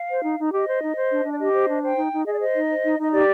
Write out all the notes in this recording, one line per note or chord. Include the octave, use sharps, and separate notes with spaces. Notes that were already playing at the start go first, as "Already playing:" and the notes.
Already playing: F5
C5
D#4
D#4
G4 D#5
C5
D#4
C5
D4
D4
D5
G4 D#5
C5
D4
C5 G5
D#4
D#4
G#4 D#5
D5
C5 D#5
D#4
C5
D#4
D#4 D#5
G4 D5